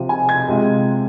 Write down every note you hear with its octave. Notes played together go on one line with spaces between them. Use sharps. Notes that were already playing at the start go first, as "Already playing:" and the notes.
Already playing: C3 F3 C4 F4
G#5
G#6
C3 G#3 F4